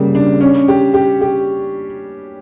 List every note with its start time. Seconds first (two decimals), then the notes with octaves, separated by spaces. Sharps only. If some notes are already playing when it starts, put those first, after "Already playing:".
Already playing: C#3 G3 A#3
0.15 D4
0.41 C#4
0.68 G4
0.94 G4
1.21 G4